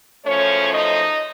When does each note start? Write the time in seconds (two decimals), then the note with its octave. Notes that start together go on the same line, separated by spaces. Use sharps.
0.24 F#2 F3 A3 C#4 C#5
0.74 D#4 D#5